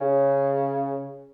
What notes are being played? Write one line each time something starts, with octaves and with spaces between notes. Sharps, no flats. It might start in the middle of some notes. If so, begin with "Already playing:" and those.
C#3